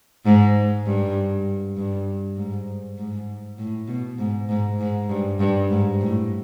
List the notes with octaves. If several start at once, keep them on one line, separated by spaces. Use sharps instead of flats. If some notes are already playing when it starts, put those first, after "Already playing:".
G#2
G2
G2
G#2
G#2
A2
B2
G#2
G#2
G#2
G2
G2
G#2
A2